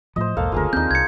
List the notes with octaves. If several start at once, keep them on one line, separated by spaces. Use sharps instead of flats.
A2 F3 C5 D#5
B1 E2 G#2 A#3 A4 F5
F#1 D2 F4 G#4 A#4
D#2 C4 D4 D#4 G6
C2 G#6 C#7